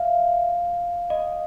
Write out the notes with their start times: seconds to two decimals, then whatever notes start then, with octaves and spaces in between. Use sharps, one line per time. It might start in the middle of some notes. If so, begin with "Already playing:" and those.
Already playing: E5 F5
1.10 D#5